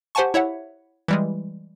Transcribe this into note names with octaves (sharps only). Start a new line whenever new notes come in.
G4 C5 F#5 G#5 A5 C#6
E4 C#5 E5 F#5
E3 G3 G#3